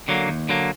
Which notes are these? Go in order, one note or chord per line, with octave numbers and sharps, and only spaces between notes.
D3 F#3 A#3
D#2
D3 F#3 A#3